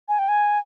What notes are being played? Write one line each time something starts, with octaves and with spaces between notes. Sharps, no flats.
G#5
G5
G#5